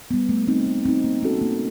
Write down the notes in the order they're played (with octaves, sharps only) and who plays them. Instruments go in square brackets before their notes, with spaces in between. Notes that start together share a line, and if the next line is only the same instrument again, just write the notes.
[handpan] G3 B3
A3
C4 D#4
A3
C4 D#4
A#3
C#4 F#4 A4
A#3